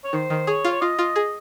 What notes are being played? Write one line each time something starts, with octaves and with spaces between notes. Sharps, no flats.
C#5
D#3 C5
D#3
G#4 C#5
F4
C#5
F4 D#5
F4
G#4